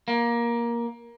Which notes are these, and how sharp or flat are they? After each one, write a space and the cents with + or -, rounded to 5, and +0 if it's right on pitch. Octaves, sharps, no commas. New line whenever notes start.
A#3 +15